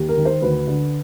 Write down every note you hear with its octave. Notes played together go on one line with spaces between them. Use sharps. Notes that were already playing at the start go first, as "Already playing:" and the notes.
Already playing: D#2
A#4
D#3
C5
D2 B4
D3